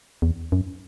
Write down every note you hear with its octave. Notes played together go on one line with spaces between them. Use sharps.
E2
F#2